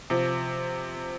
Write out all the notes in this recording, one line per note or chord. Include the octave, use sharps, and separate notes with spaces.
C3 F3